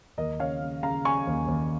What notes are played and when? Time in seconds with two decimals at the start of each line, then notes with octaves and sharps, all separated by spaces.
0.18 D#2 A#4 D#5
0.39 C#3 C#5 F5
0.61 C#3
0.83 C#3 F5 A#5
1.05 C#3 G#5 C#6
1.27 D#2
1.48 D#2